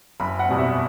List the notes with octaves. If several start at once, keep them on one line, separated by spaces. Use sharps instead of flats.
F#1 B5
F#5
E2 B2 G3 C4
E5